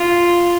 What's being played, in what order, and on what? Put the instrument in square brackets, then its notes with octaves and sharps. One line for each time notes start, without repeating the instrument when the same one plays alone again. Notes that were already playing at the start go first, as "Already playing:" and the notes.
Already playing: [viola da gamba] F4